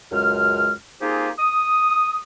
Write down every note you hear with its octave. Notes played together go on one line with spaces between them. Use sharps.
C#2 F#2 G#3 F6
A#3 C4 D#4 F4 G4 G#4
D#6